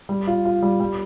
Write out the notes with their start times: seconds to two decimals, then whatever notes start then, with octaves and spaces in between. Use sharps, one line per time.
0.09 G3
0.27 F4
0.45 F4
0.63 G3
0.80 G3